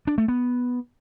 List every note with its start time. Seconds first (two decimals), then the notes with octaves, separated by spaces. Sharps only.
0.07 D4
0.18 A3
0.28 B3